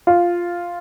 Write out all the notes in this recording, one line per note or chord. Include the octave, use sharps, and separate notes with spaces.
F4